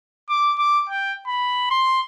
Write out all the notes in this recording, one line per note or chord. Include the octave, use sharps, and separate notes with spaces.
D6
D6
G5
B5
C6